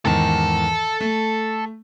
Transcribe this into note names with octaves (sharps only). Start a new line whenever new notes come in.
E2 G#2 D#3 A4 A5
A3